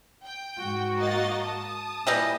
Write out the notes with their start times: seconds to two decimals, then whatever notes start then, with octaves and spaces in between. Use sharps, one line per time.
0.23 G5
0.59 G#2 F#4
0.97 A#3 D#5 A6
1.42 A5 D#6
2.07 A#2 E3 G3 D#5